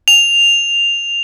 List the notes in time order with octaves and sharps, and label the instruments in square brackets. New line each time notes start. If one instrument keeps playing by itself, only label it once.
[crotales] F7